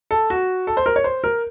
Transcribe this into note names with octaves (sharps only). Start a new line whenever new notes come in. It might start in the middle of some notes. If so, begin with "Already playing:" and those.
A4
F#4
A4
C5
A#4
C#5
C5
A#4